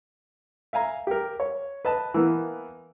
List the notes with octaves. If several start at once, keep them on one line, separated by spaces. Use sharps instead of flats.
E5 F5 G#5 A#5
G4 A#4
C#5
B4 D#5 A5
E3 A#3 B3